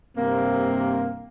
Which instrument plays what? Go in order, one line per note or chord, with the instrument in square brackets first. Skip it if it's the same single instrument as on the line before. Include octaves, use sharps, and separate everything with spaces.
[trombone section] G2 C3 C4 [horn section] A#3